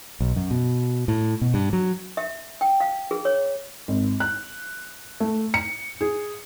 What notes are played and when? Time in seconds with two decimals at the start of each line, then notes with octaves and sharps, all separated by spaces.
0.20 B1
0.36 F#2
0.51 B2
1.08 A2
1.41 B2
1.54 G2
1.73 F#3
2.17 E5
2.61 G5
2.80 F5
3.11 G#4
3.25 C#5
3.88 G#1
4.20 F#6
5.20 A3
5.54 C#7
6.01 G#4